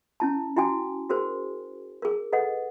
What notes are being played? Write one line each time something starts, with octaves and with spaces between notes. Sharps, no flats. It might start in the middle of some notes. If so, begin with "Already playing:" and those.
C#4 E4 A5
E4 F#4 G5 G#5 D6
F#4 G#4 A#4 C5
G#4 A#4
A4 B4 D#5 F#5